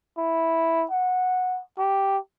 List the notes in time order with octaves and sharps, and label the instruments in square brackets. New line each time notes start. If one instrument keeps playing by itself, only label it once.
[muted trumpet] E4
F#5
G4